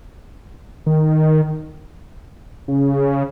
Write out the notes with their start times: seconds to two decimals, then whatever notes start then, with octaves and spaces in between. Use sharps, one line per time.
0.86 D#3
2.68 C#3